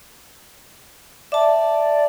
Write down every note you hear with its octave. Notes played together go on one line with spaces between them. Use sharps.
D5 E5 A5